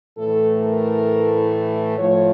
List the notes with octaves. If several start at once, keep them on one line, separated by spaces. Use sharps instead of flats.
A2 E3 A3 A4
A#4
A2 F3 A3 C#5